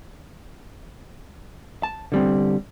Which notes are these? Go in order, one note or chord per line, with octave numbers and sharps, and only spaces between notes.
A5
D3 G3 C4